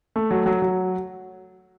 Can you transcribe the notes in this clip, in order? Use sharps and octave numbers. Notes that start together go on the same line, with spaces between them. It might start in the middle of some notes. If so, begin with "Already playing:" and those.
A3
F#3
F#3
F#3